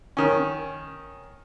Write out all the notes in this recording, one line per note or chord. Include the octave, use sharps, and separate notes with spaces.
D#3 C#4